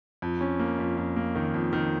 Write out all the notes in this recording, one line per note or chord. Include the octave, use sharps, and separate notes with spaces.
F2
C#4
A#3
F2
F2
A#3
D#3
F2
D#3